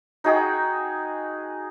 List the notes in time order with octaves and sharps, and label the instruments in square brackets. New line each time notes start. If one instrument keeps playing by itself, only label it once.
[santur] D#4 F#4 G#4 G5